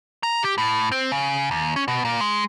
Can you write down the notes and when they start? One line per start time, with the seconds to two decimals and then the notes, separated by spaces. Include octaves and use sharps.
0.23 A#5
0.43 G4
0.58 A2
0.92 C4
1.12 C#3
1.51 D#2
1.76 C#4
1.88 B2
2.05 A#2
2.21 G#3